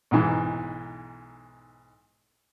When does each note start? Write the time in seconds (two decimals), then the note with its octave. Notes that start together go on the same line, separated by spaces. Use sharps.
0.11 B1 G#2 E3